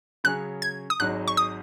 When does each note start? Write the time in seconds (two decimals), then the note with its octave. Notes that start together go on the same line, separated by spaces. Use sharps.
0.24 C#3 F#3 C#4 G#4 C#5 F#6
0.62 G#6
0.90 D#6
1.00 G#1 G#2 F#3 D#4 F#6
1.28 C#6
1.37 D#6